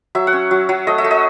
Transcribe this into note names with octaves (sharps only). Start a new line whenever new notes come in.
F#3 E5
F#5
C#4
F#3
F#3
A3 D#5
E5
A3
D#5